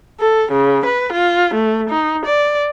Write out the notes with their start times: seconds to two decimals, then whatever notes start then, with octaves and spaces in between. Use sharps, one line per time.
0.20 A4
0.52 C#3
0.85 B4
1.14 F4
1.55 A3
1.89 D#4
2.26 D5